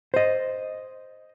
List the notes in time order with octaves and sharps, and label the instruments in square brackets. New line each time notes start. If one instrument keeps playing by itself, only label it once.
[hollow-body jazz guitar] C5 D#5